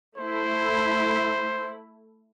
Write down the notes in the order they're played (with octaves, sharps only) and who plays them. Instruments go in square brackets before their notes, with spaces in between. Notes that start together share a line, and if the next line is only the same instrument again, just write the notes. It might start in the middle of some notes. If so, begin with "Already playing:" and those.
[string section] A3 E4 [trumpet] C5